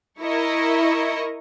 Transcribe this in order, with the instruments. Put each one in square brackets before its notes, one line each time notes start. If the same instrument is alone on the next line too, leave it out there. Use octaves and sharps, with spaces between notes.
[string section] E4 A#4 D#5 C#6